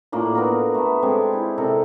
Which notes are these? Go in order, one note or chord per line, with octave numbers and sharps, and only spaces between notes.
A2 A#3 D4 F4
B3 F#4 A#4
A3 B3
G#3 C4 G4 A4
E4
C3 A4 A#4 D5